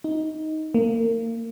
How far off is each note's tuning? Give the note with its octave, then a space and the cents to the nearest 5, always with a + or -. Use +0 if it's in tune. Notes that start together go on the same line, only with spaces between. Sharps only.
D#4 +10
A#3 -30